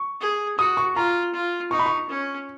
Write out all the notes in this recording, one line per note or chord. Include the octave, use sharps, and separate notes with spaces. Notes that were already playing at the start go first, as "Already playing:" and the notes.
Already playing: C#6
G#4
F#4 D#6
C#6
F4 A#5
F4
D#4 C#6
B5
C#6
C#4